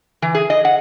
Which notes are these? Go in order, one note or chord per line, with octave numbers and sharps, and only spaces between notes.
E3
G#4
D#5
F#5